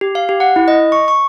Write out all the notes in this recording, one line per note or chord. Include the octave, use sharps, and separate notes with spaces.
G4
F5
G4
F#5
E4
D#5
C#6
C#6